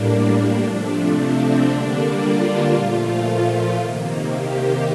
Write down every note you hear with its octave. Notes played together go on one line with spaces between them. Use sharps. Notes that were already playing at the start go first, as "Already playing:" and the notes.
Already playing: A2 G3 A#3 D4
C3 F3 A3
C4
D3 G3 A#3 D4
F4
A#2 F3 A3 F4
C3 D#3 A#3
G4